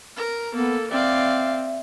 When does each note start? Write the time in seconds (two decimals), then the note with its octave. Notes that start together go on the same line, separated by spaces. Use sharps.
0.16 A#4 A#5
0.54 A#3 B3 A4
0.91 C4 D5 E5 F5